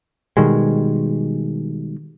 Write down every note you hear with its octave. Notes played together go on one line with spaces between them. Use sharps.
B2 D#3 G3 G#3